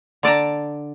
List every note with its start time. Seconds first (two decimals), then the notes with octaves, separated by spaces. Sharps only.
0.23 D3 D5 A5 A#5